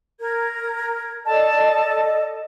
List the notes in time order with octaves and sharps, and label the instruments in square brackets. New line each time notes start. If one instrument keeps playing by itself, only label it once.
[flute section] A#4 G#6
[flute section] A4 D5 D#5 [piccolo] A5